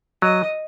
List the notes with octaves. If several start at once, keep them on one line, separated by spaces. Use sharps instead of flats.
F#3 D#5